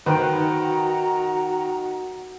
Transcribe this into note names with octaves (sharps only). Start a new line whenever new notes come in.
D#3 F#4 B4 C5 G5 A#5